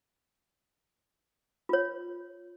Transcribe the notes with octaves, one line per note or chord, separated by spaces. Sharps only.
F4 C#5